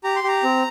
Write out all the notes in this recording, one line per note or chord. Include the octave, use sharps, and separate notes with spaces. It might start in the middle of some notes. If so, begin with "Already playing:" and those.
G4 A#5
C6
G4 A#5
C4